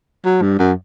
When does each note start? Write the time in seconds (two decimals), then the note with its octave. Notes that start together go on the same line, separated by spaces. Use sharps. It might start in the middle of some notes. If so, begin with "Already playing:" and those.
0.25 F#3
0.42 G2
0.59 F#2